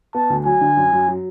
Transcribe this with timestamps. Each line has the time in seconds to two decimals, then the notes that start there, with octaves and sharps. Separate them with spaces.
0.15 B3 A5
0.30 D2
0.45 F#3 G#5
0.61 D3
0.77 F#2
0.92 F#2
1.08 F#3